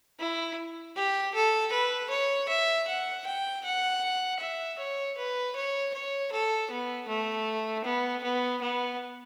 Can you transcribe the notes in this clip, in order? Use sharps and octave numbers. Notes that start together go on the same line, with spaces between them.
E4
G4
A4
B4
C#5
E5
F#5
G5
F#5
E5
C#5
B4
C#5
C#5
A4
B3
A3
B3
B3
B3